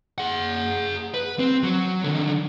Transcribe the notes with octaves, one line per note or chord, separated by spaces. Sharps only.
G#4 F#5
B4
C4
F#3 F#4
D3 D#3